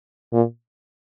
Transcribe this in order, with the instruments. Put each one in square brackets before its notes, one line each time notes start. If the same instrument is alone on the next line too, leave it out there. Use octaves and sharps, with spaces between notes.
[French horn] A#2